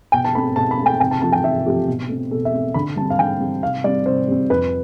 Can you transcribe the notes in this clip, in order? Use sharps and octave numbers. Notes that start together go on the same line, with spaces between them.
B2 G5
A5
A3 C4 B5
B2 A5
B5
C4
A3 G5
C3 G5
A5
F3 A3 C4 A5
G5
C3 E5
F3 A3 C4 G4
B2
A3 C4
B2 A4
E5
A3 C4
D3 B5
G3 A5
C4
F5
D3 G5
G3 C4
C3 F5
G3 C4 D5
C3 C5
G3 C4
F2 B4